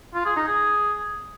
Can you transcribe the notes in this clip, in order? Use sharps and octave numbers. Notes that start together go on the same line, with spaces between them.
F4
G#4
D#4
G#4